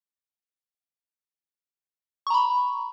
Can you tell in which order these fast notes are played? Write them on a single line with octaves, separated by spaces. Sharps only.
C#6 A#5 B5